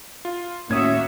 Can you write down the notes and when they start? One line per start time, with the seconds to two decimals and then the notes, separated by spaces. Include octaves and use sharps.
0.25 F4
0.70 D#2 A2 A#3 C#4 F#4 E5 D#6 G#6